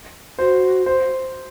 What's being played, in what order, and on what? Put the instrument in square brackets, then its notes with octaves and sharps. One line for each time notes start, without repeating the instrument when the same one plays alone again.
[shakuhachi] F#4 [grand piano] C5
[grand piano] C5